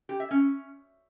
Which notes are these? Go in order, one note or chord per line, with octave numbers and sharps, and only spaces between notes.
G4
E5
C#4